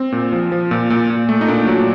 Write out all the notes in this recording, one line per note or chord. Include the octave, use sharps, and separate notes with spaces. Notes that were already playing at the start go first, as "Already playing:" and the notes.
Already playing: C4
A#2
F3
F3
A#2
A#2
A#2
A3
D#4
A#2 D4
F#3